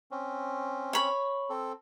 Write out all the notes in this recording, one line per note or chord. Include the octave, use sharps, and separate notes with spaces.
C4 C#4
C#5 B5
C4 A4